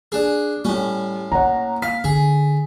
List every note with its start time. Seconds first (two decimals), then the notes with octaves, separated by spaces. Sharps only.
0.12 D4 G#4
0.65 A2 G3 C#4
1.32 A#3 C#5 F#5 A#5
1.82 F5 B6
2.04 D3 G#4